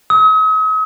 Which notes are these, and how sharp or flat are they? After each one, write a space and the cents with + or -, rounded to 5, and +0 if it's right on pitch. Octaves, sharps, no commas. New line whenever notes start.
D#6 +45